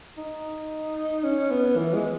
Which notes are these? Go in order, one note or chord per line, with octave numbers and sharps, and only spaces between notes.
D#4
C#4
B3
E3
G#3